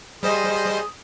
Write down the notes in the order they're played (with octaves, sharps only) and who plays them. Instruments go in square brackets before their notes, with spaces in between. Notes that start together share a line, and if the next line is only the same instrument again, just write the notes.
[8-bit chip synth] G3 C5 D#5 [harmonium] G#4